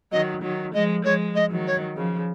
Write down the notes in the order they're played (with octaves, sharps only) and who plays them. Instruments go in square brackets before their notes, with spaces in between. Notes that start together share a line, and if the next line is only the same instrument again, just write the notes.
[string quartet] D#3 F#3 [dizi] D#5
[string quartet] D#3 F#3
[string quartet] F3 G#3 [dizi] D#5
[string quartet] F3 G#3 [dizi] C#5
[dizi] D#5
[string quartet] D#3 F#3
[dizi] C#5
[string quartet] C#3 F3